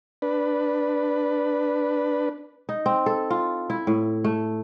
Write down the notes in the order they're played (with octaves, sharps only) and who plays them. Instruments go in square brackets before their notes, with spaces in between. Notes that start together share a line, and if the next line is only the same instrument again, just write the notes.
[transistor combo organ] D4 B4
[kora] D#4
C4
A4
F4
E4
A2
A3